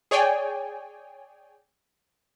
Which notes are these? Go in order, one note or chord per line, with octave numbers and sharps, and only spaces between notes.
G#4 C#5 D5 G5 G#5